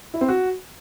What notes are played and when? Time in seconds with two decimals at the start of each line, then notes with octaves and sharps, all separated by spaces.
0.14 E4
0.21 C4
0.29 F#4